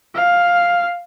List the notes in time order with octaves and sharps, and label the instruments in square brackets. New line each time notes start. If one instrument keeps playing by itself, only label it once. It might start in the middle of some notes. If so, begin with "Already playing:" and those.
[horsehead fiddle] F5